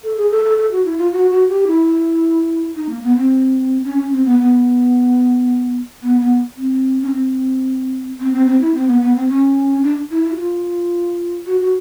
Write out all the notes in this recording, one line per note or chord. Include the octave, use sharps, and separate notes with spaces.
A4
G#4
A4
A4
A4
F#4
E4
F4
F#4
F#4
G4
E4
D#4
A#3
B3
C4
C#4
C#4
C4
B3
B3
B3
B3
C4
C#4
C4
C4
C4
C4
E4
C4
B3
B3
C4
C#4
D4
E4
E4
F#4
F4
F#4
F#4